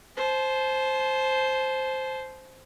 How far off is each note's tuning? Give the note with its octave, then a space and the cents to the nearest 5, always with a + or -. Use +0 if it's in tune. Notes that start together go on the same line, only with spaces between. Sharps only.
C5 +0 A5 -40